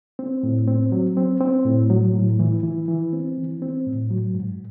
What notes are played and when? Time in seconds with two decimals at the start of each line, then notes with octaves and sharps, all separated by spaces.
0.19 C4
0.43 A2
0.68 C4
0.92 F#3
1.17 C4
1.40 C4
1.65 A2
1.90 F#3
2.14 A2
2.39 E3
2.63 E3
2.88 E3
3.13 C4
3.38 E3
3.62 C4
3.86 A2
4.10 F#3
4.35 G#2